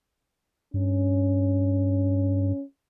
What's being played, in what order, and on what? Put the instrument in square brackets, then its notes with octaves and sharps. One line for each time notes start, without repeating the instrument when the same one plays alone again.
[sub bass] G2 [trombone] C#4